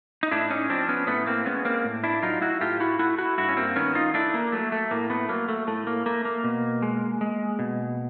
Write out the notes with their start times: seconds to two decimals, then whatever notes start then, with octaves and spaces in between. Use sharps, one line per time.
0.23 D#4
0.31 A2 D4 E4
0.50 C#4 D#4
0.69 F3 C4 D4
0.89 B3 C#4
1.07 A2 A3 B3
1.26 A#3 C4
1.46 G#3 B3 C#4
1.65 A#3 C4
1.84 A2
2.04 D4 E4
2.22 F#3 D#4 F4
2.42 E4 F#4
2.61 A2 F4 G4
2.80 E4 F#4
2.99 A3 E4 F#4
3.18 E4 F#4
3.38 G2 E4 F#4
3.49 C#4
3.57 A#3 C4
3.75 D#3 B3 C#4
3.95 D#4 F4
4.14 A3 D4 E4
4.34 A#3
4.52 F#3 A3
4.72 A3
4.91 A2 A#3
5.10 A3 B3
5.29 F#3 A#3
5.49 A3
5.67 A2 A3
5.87 A#3
6.06 A3 A#3
6.25 A#3
6.44 B2
6.82 G#3
7.21 G#3
7.59 B2